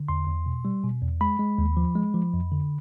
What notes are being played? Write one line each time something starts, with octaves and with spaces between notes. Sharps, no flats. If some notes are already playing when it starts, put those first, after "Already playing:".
Already playing: D3
E2 C6
E2
B2
G3
B2
E2
G#3 B5
G#3
D#2
F3
G#3
F3
F2
D3